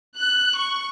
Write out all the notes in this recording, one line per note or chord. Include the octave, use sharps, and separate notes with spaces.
F#6
C#6